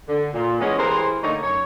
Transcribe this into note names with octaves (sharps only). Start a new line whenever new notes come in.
D3
A#2
E3 G#3 B3 C#4 G#4 D#5
E3 G4 G#4 A#4 C5
D3 A3 A#3 D#4 C#5
F#2 C#5